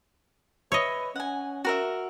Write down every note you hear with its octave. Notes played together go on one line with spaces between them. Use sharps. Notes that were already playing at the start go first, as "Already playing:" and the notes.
B4 C#5 D#5 E5
C#4 F#5 G#5
F#4 A#4 E5